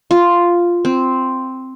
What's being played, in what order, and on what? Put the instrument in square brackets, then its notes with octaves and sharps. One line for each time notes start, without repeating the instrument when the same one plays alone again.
[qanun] F4
C4